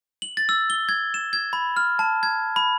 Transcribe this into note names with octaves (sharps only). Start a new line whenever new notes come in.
F#7
A6
E6
G7
G#6
E7
G#6
B5
F6
A5
G#6
B5